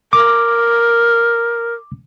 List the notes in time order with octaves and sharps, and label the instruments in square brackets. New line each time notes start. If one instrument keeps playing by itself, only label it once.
[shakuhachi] A#4 [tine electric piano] D6